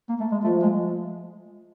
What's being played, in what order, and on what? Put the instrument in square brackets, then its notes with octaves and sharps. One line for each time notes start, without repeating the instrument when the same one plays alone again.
[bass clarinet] A#3
A3
G#3
[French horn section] F3 [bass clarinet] A3
[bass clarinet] G#3